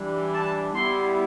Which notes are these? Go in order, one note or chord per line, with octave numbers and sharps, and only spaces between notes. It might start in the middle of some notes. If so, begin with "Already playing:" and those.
Already playing: E3 G3 D4
A5
G3 B3 E4 C6